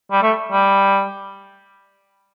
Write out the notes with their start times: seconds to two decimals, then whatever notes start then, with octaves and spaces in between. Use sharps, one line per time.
0.11 G3
0.22 A3
0.52 G3